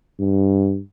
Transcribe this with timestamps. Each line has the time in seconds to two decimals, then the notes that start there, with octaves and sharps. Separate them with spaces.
0.20 G2